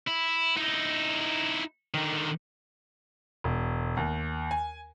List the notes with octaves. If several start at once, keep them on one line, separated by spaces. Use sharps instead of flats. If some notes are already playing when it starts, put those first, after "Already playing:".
E4
D#4 E4
D3 D#3
E1
D#2
G#5